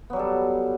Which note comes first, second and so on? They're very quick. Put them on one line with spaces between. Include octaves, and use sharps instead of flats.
B3 F#3 G3 A4